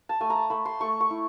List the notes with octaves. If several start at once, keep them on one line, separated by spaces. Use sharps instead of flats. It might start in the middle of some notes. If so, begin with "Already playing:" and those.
A5
A3 G#5
A#5
A5
A3 B5
C6
A3 C#6
C#6
E4